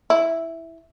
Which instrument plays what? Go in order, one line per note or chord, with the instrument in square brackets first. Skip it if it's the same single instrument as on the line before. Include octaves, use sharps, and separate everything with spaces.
[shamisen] E4